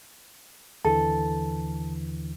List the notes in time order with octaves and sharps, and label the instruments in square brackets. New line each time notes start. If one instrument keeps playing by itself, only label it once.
[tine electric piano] D#2 D3 E3 [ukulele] A4